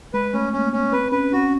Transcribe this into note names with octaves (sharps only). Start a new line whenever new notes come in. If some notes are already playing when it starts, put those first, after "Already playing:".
G#3 B4
A3 C#4
A#3 C#4
B3 C#4
C4 B4
C#4 B4
C#4 F#4